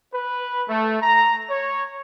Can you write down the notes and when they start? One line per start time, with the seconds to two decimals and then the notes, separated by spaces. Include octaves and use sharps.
0.13 B4
0.68 A3
1.02 A#5
1.49 C#5